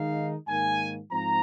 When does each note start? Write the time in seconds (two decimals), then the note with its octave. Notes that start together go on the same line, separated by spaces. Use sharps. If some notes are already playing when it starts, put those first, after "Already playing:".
Already playing: D#3 G#3 D#4 F5
0.47 G#2 D#3 A#3 G#5
1.12 G#2 F3 C4 A#5